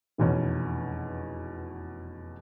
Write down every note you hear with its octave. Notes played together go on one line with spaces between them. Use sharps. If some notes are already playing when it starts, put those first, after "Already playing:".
F1 E2 B2 C#4